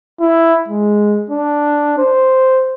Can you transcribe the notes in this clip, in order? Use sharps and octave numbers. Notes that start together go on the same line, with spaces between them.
E4
G#3
D4
C5